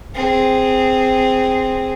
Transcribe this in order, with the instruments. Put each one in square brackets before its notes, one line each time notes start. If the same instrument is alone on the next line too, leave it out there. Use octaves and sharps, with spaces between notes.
[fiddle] C4 G#4